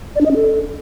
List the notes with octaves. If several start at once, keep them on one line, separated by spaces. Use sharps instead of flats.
D5
D4
D#5
C#4
A4